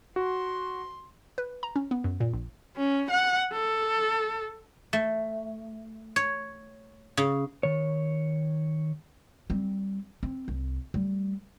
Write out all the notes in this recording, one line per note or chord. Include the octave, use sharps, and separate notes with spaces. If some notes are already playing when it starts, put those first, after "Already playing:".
F#4 C6
B4
A#5
C#4
B3
F#2
A#2
A#1
C#4
F#5
A4
A3
C#5
C#3
D#3 C#5
G3 C4
C4
C2
G3 A3